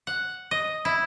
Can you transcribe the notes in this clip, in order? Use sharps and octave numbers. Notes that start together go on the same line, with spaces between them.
F#5
D#5
E4